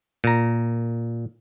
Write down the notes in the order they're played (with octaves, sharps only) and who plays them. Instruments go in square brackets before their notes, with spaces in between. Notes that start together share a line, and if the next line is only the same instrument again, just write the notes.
[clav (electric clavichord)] A#2 A#5